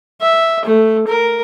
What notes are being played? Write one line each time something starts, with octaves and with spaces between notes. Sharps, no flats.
E5
A3
A#4